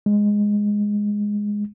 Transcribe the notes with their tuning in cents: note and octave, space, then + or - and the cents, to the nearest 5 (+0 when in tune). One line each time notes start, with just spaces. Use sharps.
G#3 -5